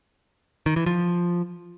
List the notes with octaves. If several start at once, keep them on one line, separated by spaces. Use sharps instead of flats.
D#3
E3
F3